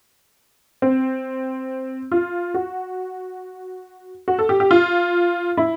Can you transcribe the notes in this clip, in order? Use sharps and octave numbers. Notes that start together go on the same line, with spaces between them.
C4
F4
F#4
F#4
A4
G4
G4
F4
E4